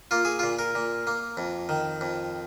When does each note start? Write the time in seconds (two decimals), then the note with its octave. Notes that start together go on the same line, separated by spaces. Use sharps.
0.11 A#3 F4
0.25 G#4
0.39 A#2 F4
0.59 A#4
0.75 A#2
1.07 A#3
1.37 F2
1.69 D#3
2.01 F2